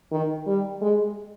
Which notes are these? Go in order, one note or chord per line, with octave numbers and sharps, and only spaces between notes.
D#3
G3
G#3